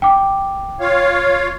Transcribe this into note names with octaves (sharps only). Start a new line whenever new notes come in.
G5 D6
F4 C#5 F5